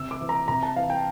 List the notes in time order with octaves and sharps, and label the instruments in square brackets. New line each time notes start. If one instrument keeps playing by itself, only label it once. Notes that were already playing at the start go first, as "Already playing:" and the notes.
Already playing: [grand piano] C3 E6
D6
E3
A#5
C3 A#5
A5
E3 F5
G5